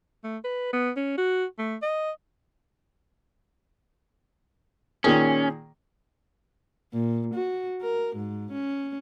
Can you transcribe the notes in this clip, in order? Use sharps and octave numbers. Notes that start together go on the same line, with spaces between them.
A3
B4
B3
C#4
F#4
A3
D#5
A#2 D#3 C#4 G#4
A#2
F#4
A#4
G#2
C#4